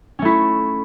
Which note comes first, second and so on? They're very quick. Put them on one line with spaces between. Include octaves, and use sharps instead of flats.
C#4 A3 E4